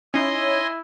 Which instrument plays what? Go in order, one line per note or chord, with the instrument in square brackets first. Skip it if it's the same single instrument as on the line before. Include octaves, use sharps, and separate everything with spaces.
[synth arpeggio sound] C#4 D#4 [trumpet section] E4 [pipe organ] D#5 G#5 C6